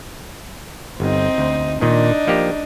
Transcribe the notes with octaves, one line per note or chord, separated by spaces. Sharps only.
G1 C4 D#4
D2
A#2 D#3 D4 D#4
F3 A#3 G4